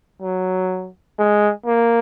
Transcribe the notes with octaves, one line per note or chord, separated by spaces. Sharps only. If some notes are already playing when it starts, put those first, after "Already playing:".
F#3
G#3
A#3